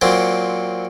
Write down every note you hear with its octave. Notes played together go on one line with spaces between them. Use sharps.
A#2 F#3 C4